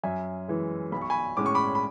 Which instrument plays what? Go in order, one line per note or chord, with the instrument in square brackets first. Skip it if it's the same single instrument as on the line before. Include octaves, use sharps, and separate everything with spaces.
[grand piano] F#2 E5 G#5
E3 G#3
B1 B5
C#6
G#5 B5
A2 G#3 C#4 D6
C#6
B5 D6
B5